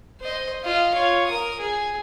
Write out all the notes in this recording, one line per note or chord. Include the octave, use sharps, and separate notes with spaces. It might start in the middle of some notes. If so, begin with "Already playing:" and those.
C5 D#5
F4 D#5
F4 C#5
A#4 D#6
G#4